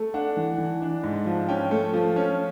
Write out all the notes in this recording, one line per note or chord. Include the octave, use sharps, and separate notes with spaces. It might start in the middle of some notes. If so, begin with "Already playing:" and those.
Already playing: A3
D4 F#5
E3
E3
D4
G#2
F3
C#4 G5
A3
F3
C#4